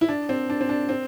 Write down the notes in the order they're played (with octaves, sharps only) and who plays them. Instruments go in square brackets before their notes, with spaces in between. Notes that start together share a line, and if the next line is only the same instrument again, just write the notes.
[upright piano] E4
D4
C4
D4
C4
D4
C4